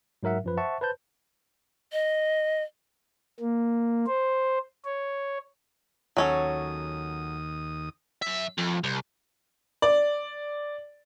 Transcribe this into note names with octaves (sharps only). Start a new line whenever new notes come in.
G#2 F#3 A#4 E5 F#5
F#2 F3 B4
C5 E5 F#5 A5 C#6
B4 C5 A5 G6
D#5
A#3
C5
C#5
D#2 F#3 C#4 A4 D#6
F#2 E5
F2
C2
D5